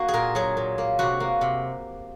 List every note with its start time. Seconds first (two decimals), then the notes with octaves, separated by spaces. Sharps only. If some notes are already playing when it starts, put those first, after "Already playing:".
Already playing: A#3 F#4
0.08 G#4
0.13 A#2 A#4
0.35 F#3 G#4
0.57 A#2
0.78 A#3
0.99 C3 F#4
1.20 A#3
1.41 C3